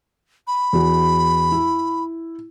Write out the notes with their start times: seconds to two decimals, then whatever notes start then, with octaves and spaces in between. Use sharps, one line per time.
0.47 B5
0.73 E2 F#4
1.52 E4